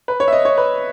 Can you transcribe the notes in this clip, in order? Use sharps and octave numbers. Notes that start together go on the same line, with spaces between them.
B4
C#5
E5
D#5
C#5
B4